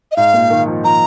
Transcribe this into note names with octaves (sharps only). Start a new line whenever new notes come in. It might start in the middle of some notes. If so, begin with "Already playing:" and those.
D#5
G#2 F5
A#2
D#3
F3
F3 A#5